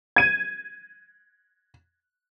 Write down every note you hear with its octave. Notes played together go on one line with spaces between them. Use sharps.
G#6 D#7